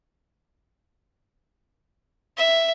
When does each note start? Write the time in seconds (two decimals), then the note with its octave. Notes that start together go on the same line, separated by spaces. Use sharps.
2.37 E5